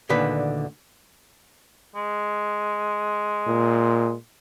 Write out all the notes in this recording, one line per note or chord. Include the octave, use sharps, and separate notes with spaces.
D2 A#2 D3 D#3 B4
G#3
A#2